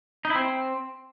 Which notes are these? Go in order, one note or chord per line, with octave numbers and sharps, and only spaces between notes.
D#4
E4
C4